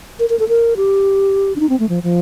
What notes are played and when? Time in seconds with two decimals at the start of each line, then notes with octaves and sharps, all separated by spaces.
0.19 A#4
0.30 A#4
0.39 A4
0.48 A#4
0.77 G4
1.56 D4
1.60 D#4
1.69 C4
1.79 A3
1.89 F3
2.03 F3